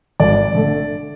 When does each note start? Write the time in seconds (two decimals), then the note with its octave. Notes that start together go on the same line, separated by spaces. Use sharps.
0.20 G#1 D5
0.54 D3 A3